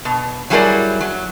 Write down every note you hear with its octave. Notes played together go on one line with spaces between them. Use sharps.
B2
F#3 G3 E4 G#4 A#4 D5
F#3